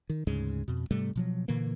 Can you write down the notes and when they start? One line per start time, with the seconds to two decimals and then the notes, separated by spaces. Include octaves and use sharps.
0.10 D#3
0.27 D2 G#2 C#3 G#3
0.68 F2 B2
0.91 G#2 C3 G3 A3
1.16 B2 F3 F#3
1.48 A#2 D3 E3 A#3